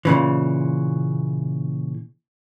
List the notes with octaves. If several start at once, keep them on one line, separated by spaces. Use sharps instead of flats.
A#2 C#3 E3